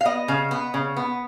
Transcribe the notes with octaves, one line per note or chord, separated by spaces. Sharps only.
F5
B3 D#5
C#3
B3
C#3
B3